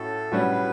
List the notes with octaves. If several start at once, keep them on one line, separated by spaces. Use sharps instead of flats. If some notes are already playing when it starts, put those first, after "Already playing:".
Already playing: A2 C#4 F#4 A4
A2 G3 C#4 F#4 B4